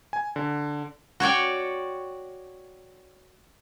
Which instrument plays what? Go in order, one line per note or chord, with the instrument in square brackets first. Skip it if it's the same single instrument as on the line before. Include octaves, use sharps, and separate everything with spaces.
[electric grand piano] G#5
D3
[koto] F#4 C#5 D5 G5